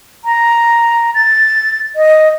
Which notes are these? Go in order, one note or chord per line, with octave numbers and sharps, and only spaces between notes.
A#5
A6
D#5